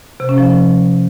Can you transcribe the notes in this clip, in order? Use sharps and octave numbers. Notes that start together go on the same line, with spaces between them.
C3
C#4
F3